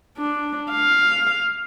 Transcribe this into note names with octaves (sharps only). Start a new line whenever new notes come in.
D4
F5